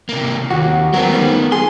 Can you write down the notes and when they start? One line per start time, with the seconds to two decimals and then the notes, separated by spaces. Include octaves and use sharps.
0.09 C3 A#3
0.50 D#2 F#4
0.94 F#3 B3 C4 A#4
1.13 G2 D#3 G3
1.52 G#4 C6